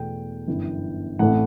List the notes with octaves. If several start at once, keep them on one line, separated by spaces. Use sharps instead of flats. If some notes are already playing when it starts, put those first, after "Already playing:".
Already playing: E2 B2 A3 G5
G1 F#2 E3
A1 A2 E3 A3 C4 F#5